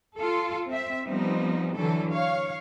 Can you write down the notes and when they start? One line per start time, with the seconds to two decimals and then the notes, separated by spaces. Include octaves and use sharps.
0.18 F4 A4
0.67 C4 E5
1.06 F3 G3 B3 C4 D#4
1.74 D3 E3 F#3 A4
2.11 C#5 F5